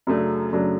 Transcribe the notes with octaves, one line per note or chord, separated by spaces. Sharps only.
F#2 C#3 F#3 A3 D4
F#2 C#3 F#3 A3 D4